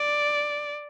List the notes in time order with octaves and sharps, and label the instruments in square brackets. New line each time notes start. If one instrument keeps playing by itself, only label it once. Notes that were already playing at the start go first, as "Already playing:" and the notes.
Already playing: [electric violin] D5